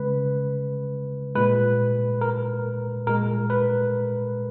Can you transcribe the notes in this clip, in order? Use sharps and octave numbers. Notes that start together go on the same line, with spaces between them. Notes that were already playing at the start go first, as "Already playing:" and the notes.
Already playing: C#3 G#3 B4
A#2 G#3 B4
A#4
A#2 G#3 A#4
B4